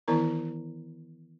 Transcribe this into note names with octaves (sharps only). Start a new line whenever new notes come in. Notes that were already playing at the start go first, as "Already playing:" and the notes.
D#3 E3 B3 E4 A#4 A#5